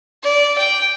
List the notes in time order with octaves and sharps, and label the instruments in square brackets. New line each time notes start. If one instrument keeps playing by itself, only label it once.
[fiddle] D5
G5